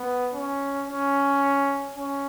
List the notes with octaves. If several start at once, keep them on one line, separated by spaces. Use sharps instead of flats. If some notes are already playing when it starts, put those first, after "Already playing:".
Already playing: B3
C#4
C#4
C#4